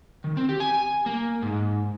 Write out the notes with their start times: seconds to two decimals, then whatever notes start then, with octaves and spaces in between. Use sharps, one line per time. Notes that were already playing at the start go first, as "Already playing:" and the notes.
0.24 D#3
0.37 C4
0.49 G4
0.60 G#5
1.06 A#3
1.42 G#2